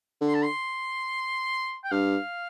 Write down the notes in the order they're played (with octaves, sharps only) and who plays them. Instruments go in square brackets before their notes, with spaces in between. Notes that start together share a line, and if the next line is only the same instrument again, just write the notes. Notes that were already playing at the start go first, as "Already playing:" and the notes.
[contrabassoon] D3
[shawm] C6
A5
C6
G5
[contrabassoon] G2 [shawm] F5